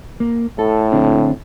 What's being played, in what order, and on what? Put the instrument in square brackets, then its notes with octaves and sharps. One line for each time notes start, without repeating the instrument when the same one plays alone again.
[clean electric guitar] A#3
[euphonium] A2 [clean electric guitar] A4
[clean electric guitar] D3 C4 D4